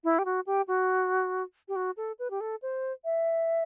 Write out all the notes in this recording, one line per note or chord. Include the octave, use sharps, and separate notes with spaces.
E4
G4
F#4
G4
F#4
G4
F#4
A4
B4
G4
A4
C5
E5